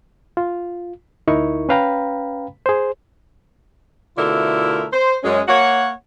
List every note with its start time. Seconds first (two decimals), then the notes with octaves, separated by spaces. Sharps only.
0.37 F4
1.27 D2 D#4 E4 A#4 C#6
1.69 C#4 B4 F5 G5 A#5 B5
2.66 G#4 C5
4.17 B2 D3 A3 E4 F4 A#4
4.93 C5
5.23 F#2 G#3 C#4
5.47 A#3 C#5 F#5